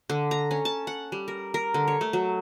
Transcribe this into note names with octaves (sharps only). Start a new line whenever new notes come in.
D3
A#5
C#4
A5
F#5
G3
A#4
A#4
D3
C#5
A3
F#3